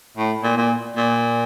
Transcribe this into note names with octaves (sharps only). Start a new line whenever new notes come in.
A2
A#2
A#2
A#2